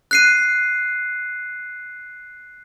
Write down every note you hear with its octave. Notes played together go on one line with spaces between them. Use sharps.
F#6 C7 D#7